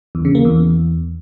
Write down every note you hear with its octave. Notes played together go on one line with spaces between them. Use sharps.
E2
C#3
A#3
E2